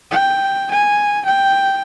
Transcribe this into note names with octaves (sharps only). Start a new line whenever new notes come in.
G5
G#5
G5